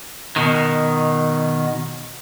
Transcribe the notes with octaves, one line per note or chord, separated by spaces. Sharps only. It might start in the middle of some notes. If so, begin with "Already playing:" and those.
B2 D#3